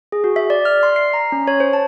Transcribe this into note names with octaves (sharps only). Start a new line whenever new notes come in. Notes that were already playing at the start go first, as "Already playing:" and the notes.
G#4
F#4
E5
D5
F6
C6
C7
A#5
C#4
C#5
C5
A5